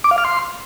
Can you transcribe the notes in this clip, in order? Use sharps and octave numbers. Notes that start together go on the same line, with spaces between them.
D6
F5
F6
C6